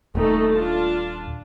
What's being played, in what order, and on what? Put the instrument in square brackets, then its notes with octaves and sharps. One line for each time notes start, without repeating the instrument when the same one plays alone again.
[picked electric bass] D#1 [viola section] A3 D#4 A4
[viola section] D4 F4 A5